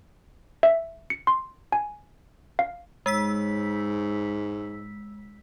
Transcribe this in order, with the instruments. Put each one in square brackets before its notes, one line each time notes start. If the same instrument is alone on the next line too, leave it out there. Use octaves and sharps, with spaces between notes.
[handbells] E5
C#7
C6
G#5
F5
[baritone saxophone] G#2 [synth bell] G#3 E6 B6